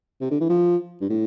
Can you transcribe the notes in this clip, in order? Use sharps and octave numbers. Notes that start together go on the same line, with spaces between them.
C3
D3
E3
F3
G2
A2